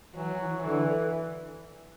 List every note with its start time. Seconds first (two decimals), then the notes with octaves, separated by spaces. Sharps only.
0.15 E3 F#3
0.39 E3
0.63 D3 E3